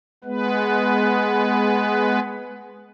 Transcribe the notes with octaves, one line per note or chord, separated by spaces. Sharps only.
G#3 B3 B4